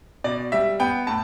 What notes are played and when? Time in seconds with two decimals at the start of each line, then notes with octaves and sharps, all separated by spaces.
0.24 B2 D5
0.52 G3 E5
0.80 B3 G5
1.07 A2 A5